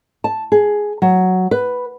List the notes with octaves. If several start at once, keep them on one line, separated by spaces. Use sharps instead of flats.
A5
G#4
F#3
B4